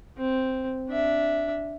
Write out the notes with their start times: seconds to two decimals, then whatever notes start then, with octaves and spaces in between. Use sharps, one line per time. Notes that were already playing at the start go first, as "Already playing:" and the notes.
0.18 C4
0.89 D4 E5